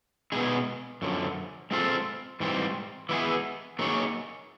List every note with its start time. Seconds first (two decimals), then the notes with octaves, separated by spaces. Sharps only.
0.32 B2 G#3 B3 D#4 G#4
1.02 F#2 D3 F3
1.71 G#3 C4 F4 A4 C5
2.40 G#2 E3 G3 C4
3.09 E3 G#3 B3 E4 G#4
3.79 F#3 A#3 D#4 G#4 C#5